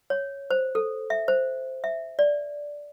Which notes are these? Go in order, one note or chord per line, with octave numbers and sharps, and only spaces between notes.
C#5
C5
A4
E5
C5
E5
D5